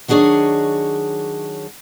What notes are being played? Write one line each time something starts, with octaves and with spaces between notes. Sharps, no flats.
D#3 F#3 D4 G#4 C#5 D#5